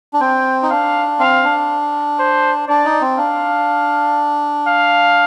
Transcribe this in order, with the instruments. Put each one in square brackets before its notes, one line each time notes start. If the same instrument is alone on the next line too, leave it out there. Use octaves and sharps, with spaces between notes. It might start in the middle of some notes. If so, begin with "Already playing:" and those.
[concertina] D4
[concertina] C4 [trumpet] G5
[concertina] D#4
[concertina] D4 [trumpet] F5
[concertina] C4 [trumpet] F5
[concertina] D4
[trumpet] C5
[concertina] D4 [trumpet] D5
[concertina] D#4
C4
[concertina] D4 [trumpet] F5
[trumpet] F5